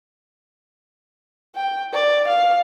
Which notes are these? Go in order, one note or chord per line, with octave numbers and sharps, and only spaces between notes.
G5
D5
F5